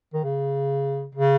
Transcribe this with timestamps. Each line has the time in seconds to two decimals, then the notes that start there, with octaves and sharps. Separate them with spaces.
0.14 D#3
0.23 C#3
1.15 C#3